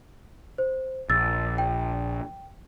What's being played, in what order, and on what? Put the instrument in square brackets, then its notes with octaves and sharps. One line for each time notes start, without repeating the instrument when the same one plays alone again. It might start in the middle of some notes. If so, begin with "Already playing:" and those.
[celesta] C5
[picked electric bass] A#1 [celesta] E6 A6
[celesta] G5